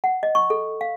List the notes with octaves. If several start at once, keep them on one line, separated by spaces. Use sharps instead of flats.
F#5
D#5
C#6
A4
F5